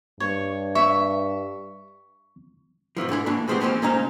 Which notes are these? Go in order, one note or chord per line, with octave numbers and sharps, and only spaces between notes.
G2 C#5
E5 C#6
G#2 B2 E3 F3
G#2 D3 E3 E4
A2 E3 A#3 D4
A2 F3 G#3 B3 C4 G4
E3 F3 A#3 C4 C#4
C#2 A#2 C#4 D#4 C5 A#5